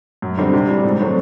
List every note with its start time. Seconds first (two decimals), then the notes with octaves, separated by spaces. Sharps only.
0.22 F#2
0.38 D3 G3 C4 D#4
0.53 C3
0.68 E3 G3
0.83 G#2
0.99 D#3 F#3 A3 C4